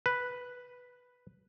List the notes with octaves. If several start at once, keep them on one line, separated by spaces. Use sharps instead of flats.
B4